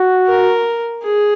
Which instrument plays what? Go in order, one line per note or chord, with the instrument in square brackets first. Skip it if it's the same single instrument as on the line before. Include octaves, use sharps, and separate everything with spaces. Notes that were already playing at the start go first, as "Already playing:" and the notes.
Already playing: [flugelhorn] F#4
[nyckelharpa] A#4
G#4